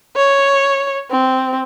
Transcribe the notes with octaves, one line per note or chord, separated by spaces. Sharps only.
C#5
C4